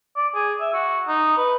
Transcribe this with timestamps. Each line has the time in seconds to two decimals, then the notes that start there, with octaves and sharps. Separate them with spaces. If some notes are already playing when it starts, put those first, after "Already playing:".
0.16 D5
0.35 G#4
0.61 E5
0.73 F#4
1.08 D#4
1.37 B4